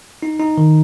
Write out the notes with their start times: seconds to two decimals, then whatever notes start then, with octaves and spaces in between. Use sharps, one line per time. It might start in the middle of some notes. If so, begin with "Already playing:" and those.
0.23 D#4
0.39 D#4
0.58 D#3